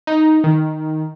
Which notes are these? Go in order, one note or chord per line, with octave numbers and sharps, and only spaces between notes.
D#4
D#3